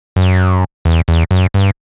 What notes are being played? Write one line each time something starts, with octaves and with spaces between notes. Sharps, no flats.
F#2
E2
E2
F#2
G2